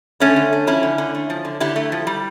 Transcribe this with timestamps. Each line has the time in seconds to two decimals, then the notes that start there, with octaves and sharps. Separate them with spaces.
0.20 D3 A3 C#4
0.36 D3
0.53 A3
0.67 F3 C#4 E4
0.83 D3
0.98 D3
1.15 A3
1.30 F3
1.45 D3
1.60 D3 E4 G4
1.76 A3
1.92 F3
2.07 G3